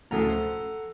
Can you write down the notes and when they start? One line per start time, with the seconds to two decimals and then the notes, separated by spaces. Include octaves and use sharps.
0.11 D2 A2 C#3 A4 F#5 A#5
0.30 C5